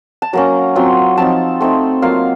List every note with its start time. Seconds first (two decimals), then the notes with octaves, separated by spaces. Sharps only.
0.22 A5
0.33 F#3 A#3 C#4 A#5
0.75 F#3 C4 F4
1.17 F3 C4 D#4 A5
1.61 A3 C4 D#4
2.02 F#3 A#3 F4 F5